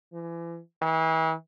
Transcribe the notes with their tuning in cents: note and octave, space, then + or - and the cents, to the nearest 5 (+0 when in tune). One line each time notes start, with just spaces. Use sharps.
E3 +35
E3 -35